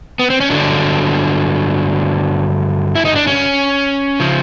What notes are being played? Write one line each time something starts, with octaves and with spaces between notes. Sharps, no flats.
B3
C4
C#4
G2 D3 F#3 D4
E4
D#4
D4
C#4
C#3 F3